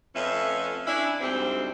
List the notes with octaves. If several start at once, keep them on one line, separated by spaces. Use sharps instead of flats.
F2 A3 C#4 B4 E5
C#4 D4 E4
D2 G#2 G3 C4